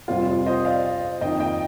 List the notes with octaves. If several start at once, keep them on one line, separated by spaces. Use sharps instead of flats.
F2 C3 G3 C4 F4
F4
C5 D#5
D5 F5
F2 D#3 A#3 D#4 D#5 G5
D#5 G5